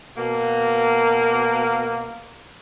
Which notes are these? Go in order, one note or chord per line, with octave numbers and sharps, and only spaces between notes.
B2 A#3